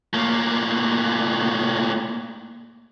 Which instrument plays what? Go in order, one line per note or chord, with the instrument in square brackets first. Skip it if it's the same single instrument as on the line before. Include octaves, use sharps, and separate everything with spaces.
[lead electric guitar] A2 A#3